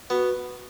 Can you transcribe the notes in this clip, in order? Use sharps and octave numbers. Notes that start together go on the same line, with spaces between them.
B3 F#4